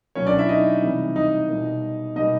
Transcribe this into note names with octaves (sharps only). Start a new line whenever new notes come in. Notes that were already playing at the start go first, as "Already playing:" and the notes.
B2 F#3 A#3 C#4 C#5
D4 D5
E4 E5
D#4 D#5
C3 E3 G3
D#4 D#5
B2 G3 A#3
B2 G3 A#3 D#4 D#5